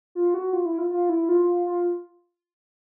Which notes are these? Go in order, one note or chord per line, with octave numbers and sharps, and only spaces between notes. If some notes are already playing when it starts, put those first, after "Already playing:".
F4
F#4
F4
E4
F4
F4
E4
F4
F4